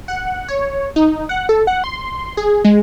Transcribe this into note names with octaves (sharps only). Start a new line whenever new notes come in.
F#5
C#5
D#4
F#5
A4
F#5
C6
G#4
G#3